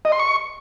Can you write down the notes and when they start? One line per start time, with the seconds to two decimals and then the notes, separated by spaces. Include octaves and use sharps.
0.05 D#5
0.12 C6
0.19 C#6